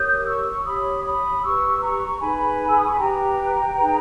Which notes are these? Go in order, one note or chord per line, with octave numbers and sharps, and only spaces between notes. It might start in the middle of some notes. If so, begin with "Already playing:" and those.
Already playing: G4 A#4 C#5 D#6 G6
C#6 E6
G4 C#5 B5 D#6
B5 D#6
G4 B4 C#6 E6
A#5 C#6
D#4 G#4 B4 G#5 B5
E6
D#6
C#6
B5
G4 B4 G5 A#5
D#4 G#4 B4